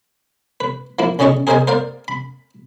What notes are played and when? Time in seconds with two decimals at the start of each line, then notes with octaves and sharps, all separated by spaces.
0.60 B4
0.99 F3 A#3 E4
1.19 B1 C#3 C#4 D5 D#5 C#6
1.47 G#4 A#4 C5 D5 D#5 G#5
1.67 A#4 C5 D5 F5
2.08 B5